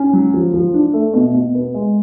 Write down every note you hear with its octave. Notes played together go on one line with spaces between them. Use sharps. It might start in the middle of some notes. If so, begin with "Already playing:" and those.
Already playing: C#4
F#3
F3
F3
D4
A3
B2
B2
B3
G#3